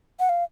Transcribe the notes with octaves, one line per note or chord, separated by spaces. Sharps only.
F#5
F5